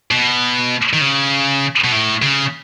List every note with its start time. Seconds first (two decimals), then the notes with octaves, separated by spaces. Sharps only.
0.11 B2
0.93 D#3
1.01 C#3
1.84 B2
1.92 A2
2.22 C#3